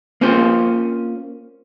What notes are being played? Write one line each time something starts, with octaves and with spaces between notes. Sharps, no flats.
A#3 C4 C#4 F4 C5